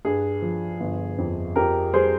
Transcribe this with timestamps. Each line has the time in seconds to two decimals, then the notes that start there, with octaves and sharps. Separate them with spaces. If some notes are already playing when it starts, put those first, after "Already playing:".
0.05 G2 G#4
0.42 F3
0.80 G1
1.18 F2
1.56 F2 G4 A#4
1.94 G3 G#4 C5